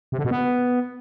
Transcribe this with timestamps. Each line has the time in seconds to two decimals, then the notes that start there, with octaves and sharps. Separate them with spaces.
0.12 C3
0.18 D3
0.25 B2
0.31 B3